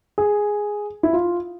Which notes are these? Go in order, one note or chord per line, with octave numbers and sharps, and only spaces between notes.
G#4
E4
F4